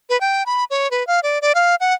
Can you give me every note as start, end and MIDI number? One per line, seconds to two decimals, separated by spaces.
0.09 0.19 71
0.21 0.43 79
0.46 0.64 83
0.70 0.90 73
0.91 1.06 71
1.07 1.20 77
1.23 1.39 74
1.42 1.52 74
1.55 1.75 77
1.80 1.94 78